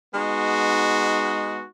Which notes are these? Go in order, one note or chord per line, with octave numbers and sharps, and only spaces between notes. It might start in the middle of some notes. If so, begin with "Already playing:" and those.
G#3 B3 D#4 F#4